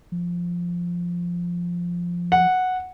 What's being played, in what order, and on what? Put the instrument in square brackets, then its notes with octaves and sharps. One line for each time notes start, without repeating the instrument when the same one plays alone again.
[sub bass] F3
[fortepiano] F#5